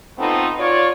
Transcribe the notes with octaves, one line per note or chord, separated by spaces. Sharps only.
A3 B3 C4 D#4 F4 A4
F4 C#5 D5